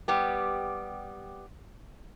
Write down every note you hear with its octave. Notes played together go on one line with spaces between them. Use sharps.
G3 B3 G4